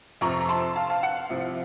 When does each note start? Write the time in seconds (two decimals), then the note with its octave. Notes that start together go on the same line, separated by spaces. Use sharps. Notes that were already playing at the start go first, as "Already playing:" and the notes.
0.21 F2 C3 F3 A#5 C#6
0.40 A#5
0.49 A5 C6
0.76 F5 A5
0.90 F5 A5
1.03 F#5
1.16 F5
1.30 C2 C3 F3